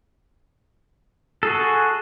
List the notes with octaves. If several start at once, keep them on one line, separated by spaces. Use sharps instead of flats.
F#4 G#4 A4